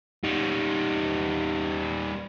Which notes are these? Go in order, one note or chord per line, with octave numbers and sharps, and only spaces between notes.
G3 D#4